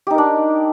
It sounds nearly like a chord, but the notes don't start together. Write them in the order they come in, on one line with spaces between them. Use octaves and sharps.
G4 D#4 A#4 D4